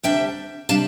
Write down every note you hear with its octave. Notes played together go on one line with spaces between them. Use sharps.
D2 C3 G3 D4 E5 G5
C3 G3 D4 F5 A5